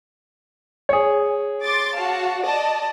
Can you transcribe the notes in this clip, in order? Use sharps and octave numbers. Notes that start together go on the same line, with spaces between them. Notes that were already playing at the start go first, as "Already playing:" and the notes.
G#4 C#5
C6 D6 A6
F#4 F5 A5
D5 D#5 A5